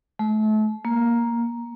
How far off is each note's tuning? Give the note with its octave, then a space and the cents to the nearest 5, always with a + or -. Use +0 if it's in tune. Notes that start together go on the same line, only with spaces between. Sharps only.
A3 -35
A#3 +10